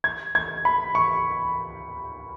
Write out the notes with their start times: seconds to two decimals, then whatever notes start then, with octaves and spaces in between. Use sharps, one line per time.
0.04 G#6
0.35 G#6
0.65 B5
0.95 C#6